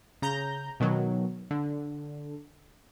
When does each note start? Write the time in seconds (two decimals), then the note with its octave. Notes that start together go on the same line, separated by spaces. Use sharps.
0.22 C#3 A#5 G6
0.80 B2 D#3 F#3
1.51 D3